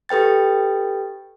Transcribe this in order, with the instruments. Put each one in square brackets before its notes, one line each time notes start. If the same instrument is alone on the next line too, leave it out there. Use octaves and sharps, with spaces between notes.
[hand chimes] G4 A4 B4 G5 A6